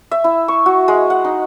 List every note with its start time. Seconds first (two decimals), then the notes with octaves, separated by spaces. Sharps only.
0.11 E5
0.24 E4
0.48 C#6
0.66 F#4
0.88 G#3
1.10 F#5
1.25 D#4